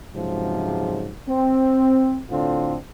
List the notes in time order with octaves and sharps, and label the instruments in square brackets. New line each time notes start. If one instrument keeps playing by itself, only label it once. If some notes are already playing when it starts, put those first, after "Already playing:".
[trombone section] C#2 G#2 C3 F3 F#3
C4
A2 D3 C4 D4 F4